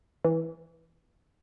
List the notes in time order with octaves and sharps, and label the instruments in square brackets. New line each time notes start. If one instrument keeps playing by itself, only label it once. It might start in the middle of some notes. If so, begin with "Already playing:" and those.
[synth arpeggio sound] E3